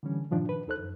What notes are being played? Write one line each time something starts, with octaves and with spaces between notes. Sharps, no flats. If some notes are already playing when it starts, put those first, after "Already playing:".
D3 E3 G3 C#4
G2 A#2 D#3 F3 D4
B4
D#2 D#4 A4 C5 F#6
F#2